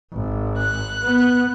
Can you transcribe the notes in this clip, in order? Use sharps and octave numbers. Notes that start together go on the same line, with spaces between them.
G#1
F#6
B3